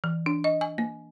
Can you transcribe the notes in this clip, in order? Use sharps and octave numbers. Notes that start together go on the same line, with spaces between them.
E3
D4
D#5
G#5
A#3